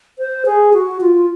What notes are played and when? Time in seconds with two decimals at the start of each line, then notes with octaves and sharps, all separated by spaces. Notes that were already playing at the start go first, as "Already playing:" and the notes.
0.19 C5
0.46 G#4
0.74 F#4
1.01 F4